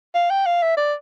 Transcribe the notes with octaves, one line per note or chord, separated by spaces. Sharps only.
F5
G5
F5
E5
D5